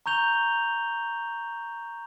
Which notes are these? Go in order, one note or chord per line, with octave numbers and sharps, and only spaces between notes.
A#5 C#6 G6 F7 G7